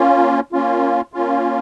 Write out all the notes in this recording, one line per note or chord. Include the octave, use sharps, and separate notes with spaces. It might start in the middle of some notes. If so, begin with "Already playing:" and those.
Already playing: A#3 C#4 F4
A#3 C#4 F4
A#3 C#4 F4